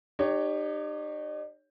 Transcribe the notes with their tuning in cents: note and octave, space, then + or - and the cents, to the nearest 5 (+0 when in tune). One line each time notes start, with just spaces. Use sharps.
D#4 -40 G4 +10 C#5 +0